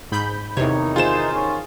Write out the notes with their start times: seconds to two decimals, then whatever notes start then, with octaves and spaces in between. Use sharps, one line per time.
0.12 G#2 B5 G6
0.57 E2 C3 D#3 E3 D#4 C#5
0.96 F4 G#4 C5 E7
1.33 D#3 C#4